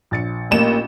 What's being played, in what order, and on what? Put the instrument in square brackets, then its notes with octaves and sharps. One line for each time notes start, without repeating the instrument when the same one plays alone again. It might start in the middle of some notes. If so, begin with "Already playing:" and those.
[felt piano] A#1 A6 C#7
[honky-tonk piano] A1 E7 [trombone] A#3